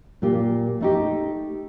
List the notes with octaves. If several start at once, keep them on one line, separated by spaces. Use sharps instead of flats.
A#2 A#3 F4 G4
A3 D#4 G4